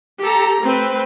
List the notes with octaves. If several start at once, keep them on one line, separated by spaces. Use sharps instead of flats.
G4 A4 A#5
A3 C4 B4